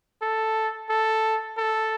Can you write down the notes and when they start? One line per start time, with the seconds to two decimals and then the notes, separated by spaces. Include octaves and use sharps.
0.22 A4
0.90 A4
1.58 A4